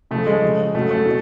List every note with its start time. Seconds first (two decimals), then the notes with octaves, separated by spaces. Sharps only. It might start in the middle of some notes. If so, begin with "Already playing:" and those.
0.11 C#3 F3 A3
0.27 G#3
0.42 C#3 F3
0.75 C#3 F#3 A3
0.91 A3
1.06 B2